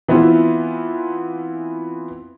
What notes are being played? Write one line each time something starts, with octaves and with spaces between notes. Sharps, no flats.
E3 B3 C4 E4 F4